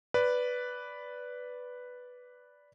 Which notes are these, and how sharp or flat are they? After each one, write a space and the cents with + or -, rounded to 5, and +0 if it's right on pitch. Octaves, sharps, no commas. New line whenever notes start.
B4 +0 D5 -10